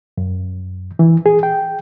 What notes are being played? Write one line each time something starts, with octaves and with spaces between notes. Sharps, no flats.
F#2
E3
G#4
G5